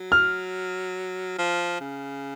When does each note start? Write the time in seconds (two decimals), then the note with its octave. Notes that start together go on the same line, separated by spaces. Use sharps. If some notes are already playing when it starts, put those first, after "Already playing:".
Already playing: F#3
0.12 F6
1.38 F3
1.81 C#3